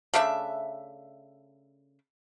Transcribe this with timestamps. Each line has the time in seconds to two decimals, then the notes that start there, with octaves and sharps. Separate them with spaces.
0.14 C#3 A3 D4 E5